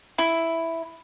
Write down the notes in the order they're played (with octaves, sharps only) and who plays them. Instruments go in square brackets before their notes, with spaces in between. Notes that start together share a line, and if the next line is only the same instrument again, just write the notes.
[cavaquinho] E4